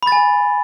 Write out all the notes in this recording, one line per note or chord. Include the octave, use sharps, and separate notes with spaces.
G#5 B5 A6